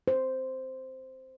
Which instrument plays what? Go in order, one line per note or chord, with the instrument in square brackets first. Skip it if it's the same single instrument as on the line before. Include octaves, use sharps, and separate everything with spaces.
[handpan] C5